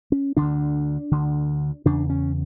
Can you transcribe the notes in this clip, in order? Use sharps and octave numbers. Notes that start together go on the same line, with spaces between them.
C#4
D2 D3 D4
D2 D3
E2 C#3 D4
C#4